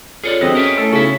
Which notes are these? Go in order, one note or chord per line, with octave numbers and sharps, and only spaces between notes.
F4 G#4 A4 C#5 D5
E2 D3 G3 C4 F#4 G#4 A4 D#5
C#4 A#4 E5 G5
A3 E4 A4
C#3 B3 D#4 F#4 A4 E5